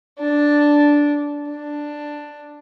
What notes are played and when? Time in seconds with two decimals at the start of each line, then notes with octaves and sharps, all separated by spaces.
0.19 D4
1.49 D4